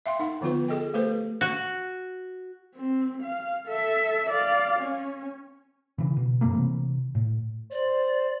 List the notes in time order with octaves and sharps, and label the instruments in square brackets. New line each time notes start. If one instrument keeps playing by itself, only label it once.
[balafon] E5 F5 G5 C6
D#4 F#5
D3 F3 B3 F4 B4
G#4 A4 D#5 G5
A3 G4 A4 B4 C5
[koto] F#4
[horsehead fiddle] C4
F5
A4 E5
D5 F5
C#4
[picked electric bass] C#3 E3
B2
F#2 G3 A3 A#3
C3 E3
A2
[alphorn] C5 [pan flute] D5